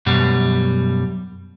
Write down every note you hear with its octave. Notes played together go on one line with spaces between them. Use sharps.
F#2 B2 G3